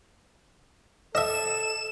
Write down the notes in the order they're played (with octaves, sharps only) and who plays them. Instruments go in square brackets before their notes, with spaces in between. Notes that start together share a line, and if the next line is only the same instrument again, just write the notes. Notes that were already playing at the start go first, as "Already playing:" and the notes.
[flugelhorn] A4 [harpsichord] D#5 E5 [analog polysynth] E7